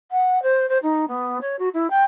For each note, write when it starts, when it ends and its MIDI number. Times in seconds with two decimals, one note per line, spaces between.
0.11 0.41 78
0.42 0.66 72
0.69 0.78 72
0.83 1.05 63
1.08 1.38 59
1.41 1.56 73
1.59 1.68 66
1.74 1.87 64
1.90 2.03 79